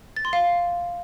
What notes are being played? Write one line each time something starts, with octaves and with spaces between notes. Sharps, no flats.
A6
C6
F5